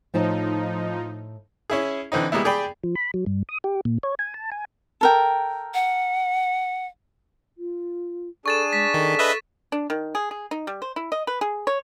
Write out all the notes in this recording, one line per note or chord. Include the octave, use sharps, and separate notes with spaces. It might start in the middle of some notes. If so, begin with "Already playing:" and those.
A2 F3 D#4 C5 A5
C#4 E4 G#4
D3 E3 C4 D#4
G3 G#3 A#3 B3 E4
G4 G#4 D5 G5 B5
F3
B5
F#3
G2
D#6
G4
A#2
C#5
G#5
A5
G#5
A4 A#4 G5
F#5
F4
D4 G#4 A4 C#6 A6 E7
G#3 B6
D#3 A4
B4 D#5 E5
D4
D#3
G#4
G#4
D#4
G3
C5
E4
D#5
B4
G#4
C#5